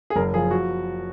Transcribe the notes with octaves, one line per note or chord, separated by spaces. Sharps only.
G#4
F#1 A#4
F3 G#4
F#4